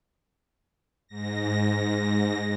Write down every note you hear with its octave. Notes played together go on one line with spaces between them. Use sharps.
G#2 A#6